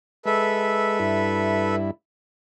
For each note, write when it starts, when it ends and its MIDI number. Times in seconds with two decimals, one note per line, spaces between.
0.25 0.99 56
0.25 1.75 69
0.25 1.75 71
0.25 1.75 76
1.00 1.91 43
1.00 1.91 64